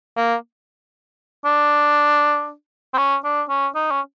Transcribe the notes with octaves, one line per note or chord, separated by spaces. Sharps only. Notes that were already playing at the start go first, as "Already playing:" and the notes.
A#3
D4
C4
C#4
D4
C#4
D#4
C#4